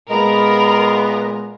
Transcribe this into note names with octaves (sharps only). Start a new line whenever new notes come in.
A#2 G#3 B3 A#4 B5